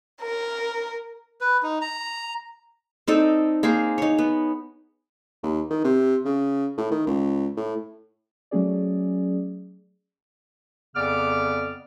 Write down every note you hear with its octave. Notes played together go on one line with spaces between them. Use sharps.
A#4
B4
D#4
A#5
C4 D#4 A4 D5
A#3 G#4 A#4 C5
D#4 C#5
B3
D#2
D#3
C3
C#3
A2
D#3
C#2
A2
F#3 A3 C#4 G#4 D5
F2 C#3 B3 D5 D6 F6